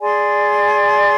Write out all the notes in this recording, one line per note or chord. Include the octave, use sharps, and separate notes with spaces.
G#4 D5 G#5 C6